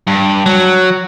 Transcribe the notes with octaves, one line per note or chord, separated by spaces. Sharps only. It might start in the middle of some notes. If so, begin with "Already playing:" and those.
G2
F#3